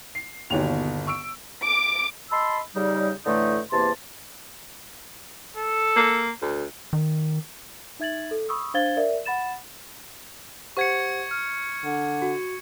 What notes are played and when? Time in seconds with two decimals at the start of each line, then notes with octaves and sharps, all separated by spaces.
0.15 C7
0.50 G1 D#2 B2 C#5 F7
1.07 C#6 E6 D7
1.63 D6
2.32 D#5 A5 B5 C6 E6
2.75 C#3 G3 D#4
3.25 A2 D3 E3 A3 D#4 E4
3.72 E2 C3 E3 A#3 A5 C6
5.57 A4
5.96 A#3
6.42 D2
6.93 D#3
8.00 D#4 E5 G#6 A6 F#7
8.31 A4
8.49 B5 C#6 D#6 E6
8.74 D4 C5 F5 G#6 A6 G7
8.97 A#4 D5 E5
9.25 F#5 B5 A6 E7
10.77 G4 C5 F#5 C#6 G#6 C#7
11.31 F6
11.84 D3
12.22 F#4